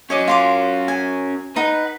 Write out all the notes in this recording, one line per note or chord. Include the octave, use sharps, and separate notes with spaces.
C#4 F#4 C#5 D#5 D6
F4 C6 D6
G#5
D#4 B4 F#5